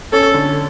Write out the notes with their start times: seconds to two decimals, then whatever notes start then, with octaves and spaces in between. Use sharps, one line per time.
0.12 C#4 A4
0.34 D3